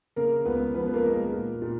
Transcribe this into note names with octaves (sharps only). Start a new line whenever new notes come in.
C#3 A#3 A#4
C#2 B3 B4
F3 B3 B4
B4
A#3 A#4
G#3
A#3 A#4
A#2
A#2